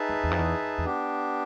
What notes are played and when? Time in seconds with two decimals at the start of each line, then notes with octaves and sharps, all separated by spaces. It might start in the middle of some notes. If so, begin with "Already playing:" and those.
Already playing: D#4 G#4 B4 E5 A5
0.09 E2
0.24 E2
0.31 F2
0.39 E2
0.78 E2
0.85 B3 D4 G4